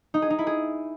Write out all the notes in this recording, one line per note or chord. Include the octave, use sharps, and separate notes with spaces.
D#4
G#4
D#4
E4
G#4